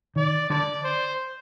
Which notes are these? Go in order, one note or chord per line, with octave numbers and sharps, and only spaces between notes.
D#3 D5
D3 D5
C5